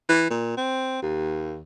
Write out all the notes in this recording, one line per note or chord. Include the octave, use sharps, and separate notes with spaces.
E3
A#2
C4
D#2